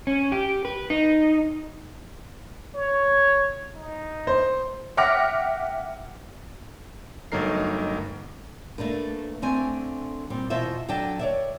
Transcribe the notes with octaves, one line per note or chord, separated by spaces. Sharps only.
C#4
G4
B4
D#4
C#5
D#4
C5
E5 F#5 G5 D6 F6 A#6
G1 F#3 A3 D#4 A#4 C7
A3 A#3 D4 B4
D3 A3 C4 G#5
A#2 G3 C4
E2 B2 F4 C5 E5
D3 F#3 D5 G5 A5
C#5 D5 E5